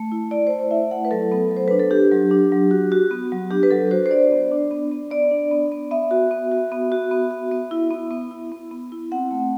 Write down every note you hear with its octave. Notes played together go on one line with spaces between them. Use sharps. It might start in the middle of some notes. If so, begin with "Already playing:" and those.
Already playing: A3
E4
E4 D5
A3 C5
D5
E4 E5
A3 F#5
B4
F#3 A4
B3
F#3
C5
D4 B4
A4
D4 G4
F#3
D4
F#3
F#4
F#4
B3
F#3
D4 G4
B4
F#3 A4
F#4 C5
C5
D4 D5
B3
D4
B3
B3
B3 D5
D4
B3
B3
B3 E5
F#4
B3
F#4
B3
F#4
B3
F#4
B3
E4
B3
B3
E4
B3
B3
E4
C4 F#5
A3